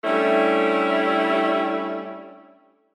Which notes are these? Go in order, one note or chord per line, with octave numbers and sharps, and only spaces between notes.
G3 A3 C#4 D4 E4